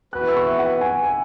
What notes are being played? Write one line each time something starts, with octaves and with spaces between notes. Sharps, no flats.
E3 B3 F#4 B4 F#6
E6
C#6
E5
F#5
G#5
G#5